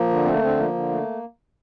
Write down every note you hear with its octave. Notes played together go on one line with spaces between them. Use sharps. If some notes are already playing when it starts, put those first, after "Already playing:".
Already playing: F3 A#3
D3
A3 C4
A#3
D3 C4
F3 A#3
D3
A3